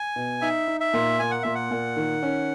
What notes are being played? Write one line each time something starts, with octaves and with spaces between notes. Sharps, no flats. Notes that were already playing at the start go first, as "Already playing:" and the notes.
Already playing: G#5
B2
D#4 E5
D#4
E5
A#2
A#3 G#5
F#5
A#2 E5
F#5
A#2
D#3
C#4